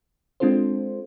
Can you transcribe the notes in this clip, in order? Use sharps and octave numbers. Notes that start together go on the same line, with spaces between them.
G#3 C4 D4 F4 A4 C5